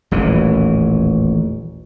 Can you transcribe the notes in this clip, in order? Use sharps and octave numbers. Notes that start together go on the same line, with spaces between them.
D#1 A1 E2 E3